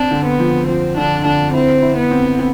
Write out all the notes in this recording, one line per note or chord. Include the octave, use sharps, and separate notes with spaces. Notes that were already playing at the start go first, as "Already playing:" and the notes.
Already playing: C4 D4
D3
B3
F3
F3 C4
D3 D4
D3 D4
C4 E4
E4
B3
C4
C4